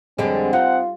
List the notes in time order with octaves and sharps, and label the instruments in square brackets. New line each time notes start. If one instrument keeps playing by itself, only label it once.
[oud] F2 D3 G3 [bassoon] G#3 [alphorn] C4
[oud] D#4 [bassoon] F4 [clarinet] F#5